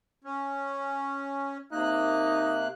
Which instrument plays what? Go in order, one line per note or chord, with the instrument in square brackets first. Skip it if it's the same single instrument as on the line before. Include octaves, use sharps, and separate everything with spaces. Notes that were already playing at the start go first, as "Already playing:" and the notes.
[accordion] C#4
[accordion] C3 A#3 F#6 [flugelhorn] D#4